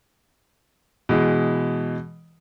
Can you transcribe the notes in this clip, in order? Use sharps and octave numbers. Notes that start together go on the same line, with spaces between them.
B2 E3 G#3